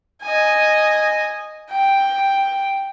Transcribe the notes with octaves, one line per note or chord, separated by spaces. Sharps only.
D#5 G#5
G5